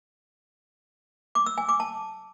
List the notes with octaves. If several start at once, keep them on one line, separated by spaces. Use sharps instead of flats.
D6
E6
G#5
D6
A5